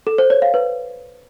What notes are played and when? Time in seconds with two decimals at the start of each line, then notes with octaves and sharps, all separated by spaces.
0.07 A4
0.18 C5
0.30 C#5
0.42 F5
0.54 B4